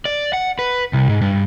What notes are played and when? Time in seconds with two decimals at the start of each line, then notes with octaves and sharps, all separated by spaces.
0.05 D5
0.33 F#5
0.59 B4
0.93 C2
1.09 G#2
1.21 G2